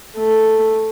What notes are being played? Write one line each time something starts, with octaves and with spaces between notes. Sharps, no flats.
A3